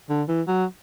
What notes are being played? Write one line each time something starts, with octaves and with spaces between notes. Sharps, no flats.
D3
E3
F#3